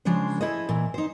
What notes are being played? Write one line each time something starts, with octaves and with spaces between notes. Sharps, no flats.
C#3 F3 G#3 D4 C5
E4 G#4 A4 C5 D#5
A#2 E3
D#4 C5